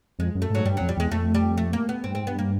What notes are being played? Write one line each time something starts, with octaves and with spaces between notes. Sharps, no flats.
F2 G#3
F#2
A3
G#2 F#3
G2 G3
F2 F#3
G3
E2 G#3
F2 A3
G3
A3
A#3
B3
G2 C4
G#2 C4
G2 B3
A#3